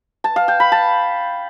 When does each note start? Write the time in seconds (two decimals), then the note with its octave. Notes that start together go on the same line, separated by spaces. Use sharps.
0.24 A5
0.36 F5
0.48 G5
0.60 B5
0.72 A5